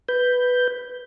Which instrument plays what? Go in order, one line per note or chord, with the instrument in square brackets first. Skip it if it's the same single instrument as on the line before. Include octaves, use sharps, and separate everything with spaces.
[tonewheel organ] B4 G6